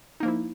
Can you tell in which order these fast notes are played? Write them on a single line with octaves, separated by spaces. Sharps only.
D#4 A#3 F3 E4